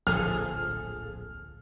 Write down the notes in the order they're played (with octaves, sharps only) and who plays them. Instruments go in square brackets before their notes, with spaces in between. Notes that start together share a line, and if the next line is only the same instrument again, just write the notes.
[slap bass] D1 A#1 [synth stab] F3 G#4 A4 [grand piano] F6